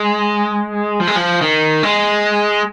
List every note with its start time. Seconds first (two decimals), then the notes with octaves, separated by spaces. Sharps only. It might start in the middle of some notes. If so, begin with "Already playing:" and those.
Already playing: G#3
1.00 F3
1.07 G#3
1.16 F3
1.41 D#3
1.83 G#3